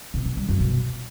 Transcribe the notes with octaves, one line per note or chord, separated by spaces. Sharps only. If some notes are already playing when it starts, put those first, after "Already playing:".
B2
E3
G3
F#2
B2